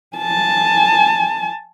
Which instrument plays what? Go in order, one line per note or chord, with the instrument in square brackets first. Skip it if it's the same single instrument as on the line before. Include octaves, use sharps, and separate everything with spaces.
[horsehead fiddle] G#5 A5